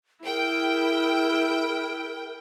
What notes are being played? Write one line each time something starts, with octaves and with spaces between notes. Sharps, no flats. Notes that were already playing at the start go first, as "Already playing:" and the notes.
E4 G#4 A#4 G5